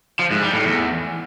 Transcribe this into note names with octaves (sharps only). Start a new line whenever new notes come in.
F3
G#2
G3
A2
E2